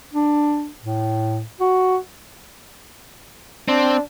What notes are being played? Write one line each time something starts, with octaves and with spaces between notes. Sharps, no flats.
D4
A2
F#4
C4 D4